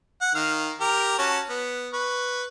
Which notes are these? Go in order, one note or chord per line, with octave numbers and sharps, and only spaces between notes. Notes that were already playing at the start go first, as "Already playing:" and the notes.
F#5
D#3 F5
G4 A#4
C#4 F#4 A5
B3
B4 C#6